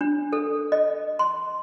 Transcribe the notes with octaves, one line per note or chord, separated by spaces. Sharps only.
D4
A4
D#5
C6